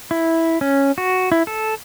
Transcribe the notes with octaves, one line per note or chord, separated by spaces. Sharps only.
E4
C#4
F#4
E4
A4